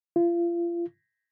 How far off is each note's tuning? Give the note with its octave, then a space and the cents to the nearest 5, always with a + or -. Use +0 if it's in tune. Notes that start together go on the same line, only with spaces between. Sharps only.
F4 -35